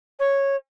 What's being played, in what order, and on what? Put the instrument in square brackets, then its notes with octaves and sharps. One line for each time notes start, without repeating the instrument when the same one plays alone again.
[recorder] C#5